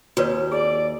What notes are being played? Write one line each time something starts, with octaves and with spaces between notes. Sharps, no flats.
D#2 F#4 B4 C#5
G#4 D5